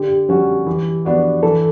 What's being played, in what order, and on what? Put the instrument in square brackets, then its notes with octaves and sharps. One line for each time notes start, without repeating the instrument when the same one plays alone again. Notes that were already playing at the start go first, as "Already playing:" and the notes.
Already playing: [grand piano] D3 [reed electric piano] G4
[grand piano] G3 C#4 F#4
E3
B3 D4 F#4
[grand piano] E3 [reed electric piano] A4